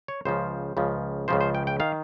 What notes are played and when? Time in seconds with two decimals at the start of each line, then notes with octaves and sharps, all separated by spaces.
0.08 C#5
0.25 C#2 C#3 F3 C5
0.77 C#2 C#3 F3
1.28 C#2 C#3 F3 C5
1.41 C5
1.55 G5
1.67 G5
1.80 D#3 F5